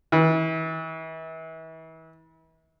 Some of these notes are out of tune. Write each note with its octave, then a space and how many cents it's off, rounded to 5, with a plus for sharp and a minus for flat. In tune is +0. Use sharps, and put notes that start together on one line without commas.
E3 -35